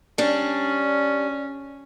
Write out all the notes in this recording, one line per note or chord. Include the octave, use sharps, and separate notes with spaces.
G3 C#4 D4